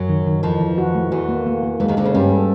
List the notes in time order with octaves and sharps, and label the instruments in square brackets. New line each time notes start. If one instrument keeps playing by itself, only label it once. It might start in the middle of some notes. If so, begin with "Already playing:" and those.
Already playing: [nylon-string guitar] F#2 F#3
[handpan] D#3
D#3
[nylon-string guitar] F2 F3 [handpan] E3
[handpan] E3
F#4
A3
[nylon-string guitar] E2 E3 [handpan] F#4
[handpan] A#3
A#3
A#3
[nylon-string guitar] E2 E3 [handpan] G#3
[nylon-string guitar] D#2 D#3
[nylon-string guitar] D2 D3 [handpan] G#3
[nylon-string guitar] C#3
[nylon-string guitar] G2 G3 [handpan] C#4
[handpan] A4